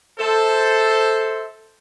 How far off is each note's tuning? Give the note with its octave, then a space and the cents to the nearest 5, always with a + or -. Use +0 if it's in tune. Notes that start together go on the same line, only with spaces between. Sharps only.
A4 +0 C5 +0 E5 -25